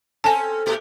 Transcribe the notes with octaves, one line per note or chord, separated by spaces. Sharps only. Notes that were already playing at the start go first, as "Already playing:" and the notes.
C4 C#4 A4 G#5 A5
A#2 A3 G4